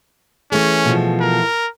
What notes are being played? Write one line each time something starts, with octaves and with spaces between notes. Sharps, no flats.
E3 A3 C#4 G#4
B2 F3
A#4